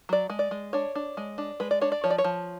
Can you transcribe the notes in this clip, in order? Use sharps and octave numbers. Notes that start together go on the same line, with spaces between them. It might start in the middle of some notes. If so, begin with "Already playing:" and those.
F#3 D5
G#3
D5
G#3
D4 C#5
D4
G#3
D4
G#3 B4
D5
D4 C#5
D5
F3 C#5
D5
C#5
F3